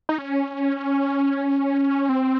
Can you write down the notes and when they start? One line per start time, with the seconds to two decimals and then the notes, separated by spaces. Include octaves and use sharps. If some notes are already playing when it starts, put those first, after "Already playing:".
0.09 D#4
0.18 C#4
2.09 C4